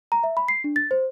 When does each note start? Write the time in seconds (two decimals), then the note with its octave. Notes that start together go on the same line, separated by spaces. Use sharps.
0.12 A#5
0.24 E5
0.37 B5
0.48 C7
0.64 D4
0.76 A6
0.91 C5